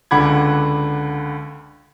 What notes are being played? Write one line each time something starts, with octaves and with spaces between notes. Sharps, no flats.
C#2 D3 F#5 B5 D6 G#6